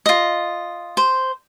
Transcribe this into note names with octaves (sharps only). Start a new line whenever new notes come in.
F4 D#5
C5